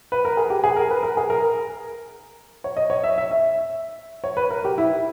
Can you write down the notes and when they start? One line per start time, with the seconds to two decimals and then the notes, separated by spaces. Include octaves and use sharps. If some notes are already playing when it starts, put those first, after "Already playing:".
0.12 B4
0.25 A#4
0.37 G#4
0.50 G4
0.64 G#4
0.76 A#4
0.91 B4
1.03 A#4
1.17 G#4
1.30 A#4
2.64 C#5
2.77 D#5
2.90 C#5
3.04 E5
3.18 E5
3.31 E5
4.24 C#5
4.37 B4
4.50 A#4
4.65 G4
4.78 E4